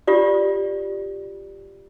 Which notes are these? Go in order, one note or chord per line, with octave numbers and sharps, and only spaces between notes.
F4 G4 D5